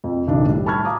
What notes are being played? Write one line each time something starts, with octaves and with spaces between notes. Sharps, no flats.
F2
F#1 B1 D#3 D4 D#5
A2 G3
A5 B5 C#6 F6 G#6
F5 A#5 D6 D#6